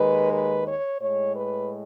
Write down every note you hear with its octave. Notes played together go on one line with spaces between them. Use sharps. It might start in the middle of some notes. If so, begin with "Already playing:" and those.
Already playing: D#2 D#3 G#3 B4
B4
C#5
A2 G#3 C#5
B4